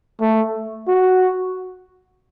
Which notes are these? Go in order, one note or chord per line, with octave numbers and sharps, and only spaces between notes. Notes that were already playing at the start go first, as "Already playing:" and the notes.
A3
F#4